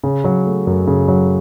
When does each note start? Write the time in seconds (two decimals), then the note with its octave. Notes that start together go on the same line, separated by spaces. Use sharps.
0.04 C#3
0.24 F#3
0.46 A3
0.67 F#2
0.87 C#3
1.08 F#3